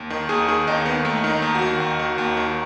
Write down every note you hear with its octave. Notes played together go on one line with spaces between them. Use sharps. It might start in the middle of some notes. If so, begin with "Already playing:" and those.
Already playing: D#2
D#3
D#2 G#4
D#3 G#4
D#2 D#4
D#3 B3
D#2 A3
D#3
D#4
D#2
F#4
D#3
D#2
D#3
D#2
D#3